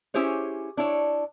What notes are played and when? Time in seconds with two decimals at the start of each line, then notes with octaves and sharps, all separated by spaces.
0.14 C#4 E4 G4 G#4 C5 C#5
0.77 D4 E4 C#5